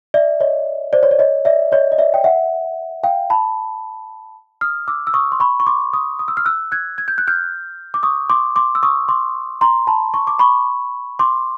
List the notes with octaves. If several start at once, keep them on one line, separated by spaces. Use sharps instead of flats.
D5 E5
C#5 D#5
C5 D5
C#5
D5
C#5 D#5
D5 E5
C#5 D#5
D#5
D5 E5
G5
E5 F#5
F5 G5
A5 B5
D#6 F6
D6 E6
E6
C#6 D#6
C6
B5 C#6
C#6
C6 D6
C#6 D#6
D#6
E6
F6
E6 F#6
F#6 G#6
G#6
G6
F#6
F6 G6
D6
C#6 D#6
C6 D6
C6 D6
E6
C#6 D#6
C6 D6
A#5 C6
A5 B5
C#6
D6
B5 C#6
C6 D6